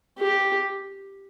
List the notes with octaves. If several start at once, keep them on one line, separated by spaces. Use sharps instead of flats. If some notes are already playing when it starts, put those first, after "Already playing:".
G4